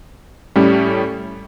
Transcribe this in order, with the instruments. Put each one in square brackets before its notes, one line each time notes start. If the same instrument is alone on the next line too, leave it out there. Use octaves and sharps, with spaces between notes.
[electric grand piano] A2 G3 C#4